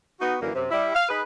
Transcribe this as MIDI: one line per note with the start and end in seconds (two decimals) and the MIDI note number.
0.20 0.35 59
0.20 0.35 63
0.20 0.35 66
0.41 0.50 42
0.41 0.50 50
0.41 0.50 52
0.41 0.50 58
0.55 0.66 42
0.55 0.66 48
0.71 0.93 55
0.71 0.93 64
0.95 1.06 77
1.09 1.22 63
1.09 1.22 68
1.09 1.22 71